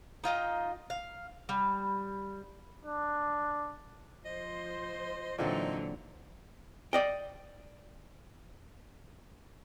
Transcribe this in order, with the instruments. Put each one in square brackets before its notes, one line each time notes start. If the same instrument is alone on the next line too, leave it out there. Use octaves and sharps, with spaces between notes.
[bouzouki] D#4 F4 D#5 G5
F5
G3
[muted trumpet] D4
[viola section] F3 C5 C6 [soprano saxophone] D#5
[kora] A#2 C4 A4 [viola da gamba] D3 E3 F#3 [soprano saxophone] D#4
[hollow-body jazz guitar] D5 D#5 G5